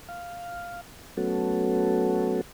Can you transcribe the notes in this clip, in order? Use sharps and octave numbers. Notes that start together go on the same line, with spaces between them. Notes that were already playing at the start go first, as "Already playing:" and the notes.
F5
F#3 A3 B3 C#4 F#4 A4